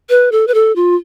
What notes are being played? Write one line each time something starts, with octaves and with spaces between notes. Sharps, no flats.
B4
A4
B4
A4
F4